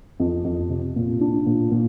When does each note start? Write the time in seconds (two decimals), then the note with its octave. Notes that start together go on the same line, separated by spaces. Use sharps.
0.20 F2
0.44 F2
0.70 C3
0.96 A#2
1.21 D4
1.47 A#2
1.72 A#2